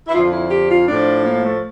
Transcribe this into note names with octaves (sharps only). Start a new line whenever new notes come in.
E4
F2 D3 F3 F4
E4
G4
F4
A2 F3 D4
A#3
A3